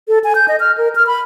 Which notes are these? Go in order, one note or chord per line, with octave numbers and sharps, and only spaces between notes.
A4
G#5
G6
D#5
F6
A#4
F6
B5